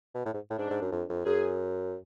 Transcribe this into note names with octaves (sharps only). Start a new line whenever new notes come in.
B2
A2
G#2
A2
G#2 D4
G#2
F#2
F2
F2
F#2 G#4